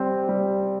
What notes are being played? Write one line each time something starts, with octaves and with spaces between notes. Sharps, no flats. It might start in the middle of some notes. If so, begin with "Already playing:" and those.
Already playing: C3 G3 C4
G3